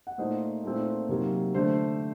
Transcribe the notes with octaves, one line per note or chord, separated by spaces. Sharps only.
F#5
A#2 A3 D#4 C5 D#5
A#2 A3 C4 D#4
C3 F#3 A#3 D#4
D3 A3 D4 C5